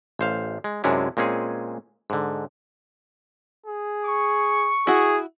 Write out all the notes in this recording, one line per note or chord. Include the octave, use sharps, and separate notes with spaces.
A1 C5 F5
G#3
F#2 C3 G#3 C#4 D4 E4
A#2 G#3 C4 C#4 G#4
G#2 D3
G#4
C#6
E4 F#4 G#4